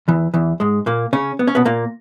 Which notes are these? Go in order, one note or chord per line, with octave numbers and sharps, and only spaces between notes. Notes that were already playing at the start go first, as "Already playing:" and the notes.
E2 E3
E2 E3
G#2 G#3
A#2 A#3
C#3 C#4
B3
C#4
B2 B3
A#2 A#3